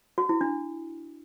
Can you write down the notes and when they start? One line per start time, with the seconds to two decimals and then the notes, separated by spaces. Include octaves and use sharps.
0.18 F#4
0.29 E4
0.41 D4